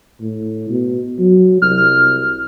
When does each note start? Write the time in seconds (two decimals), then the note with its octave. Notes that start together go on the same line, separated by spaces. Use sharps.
0.21 A2
0.69 B2
1.19 F#3
1.62 C2 F6